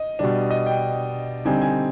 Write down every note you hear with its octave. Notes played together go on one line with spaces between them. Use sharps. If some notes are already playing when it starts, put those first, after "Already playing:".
Already playing: D#5
B2 G3 D4
D#5
G5
D3 G3 C4 D#4 G#5
G#5